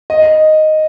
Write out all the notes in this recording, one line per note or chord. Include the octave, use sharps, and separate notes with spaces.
D#5